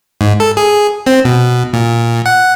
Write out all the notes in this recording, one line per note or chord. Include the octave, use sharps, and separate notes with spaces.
G#2
A4
G#4
C4
B2
A#2
F#5